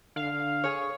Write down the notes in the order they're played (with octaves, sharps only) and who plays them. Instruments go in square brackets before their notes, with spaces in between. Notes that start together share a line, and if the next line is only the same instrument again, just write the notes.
[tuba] D3 [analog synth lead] F5
[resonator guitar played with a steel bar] G#4 C#5